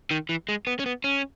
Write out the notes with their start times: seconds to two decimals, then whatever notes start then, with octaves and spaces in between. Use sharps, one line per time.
0.11 D#3
0.29 E3
0.49 G#3
0.67 B3
0.79 C#4
0.86 B3
1.04 C#4